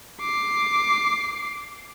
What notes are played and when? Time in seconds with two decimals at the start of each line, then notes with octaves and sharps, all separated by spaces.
0.21 D6 C7